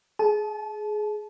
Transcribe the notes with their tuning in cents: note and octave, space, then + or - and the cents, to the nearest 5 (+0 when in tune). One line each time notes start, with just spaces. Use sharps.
G#4 +20 A5 -25